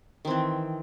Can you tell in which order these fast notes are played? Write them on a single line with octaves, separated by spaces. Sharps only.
D#3 C4 E3